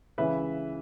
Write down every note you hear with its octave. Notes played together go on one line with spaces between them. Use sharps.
C#2 C#3 E3 B4 E5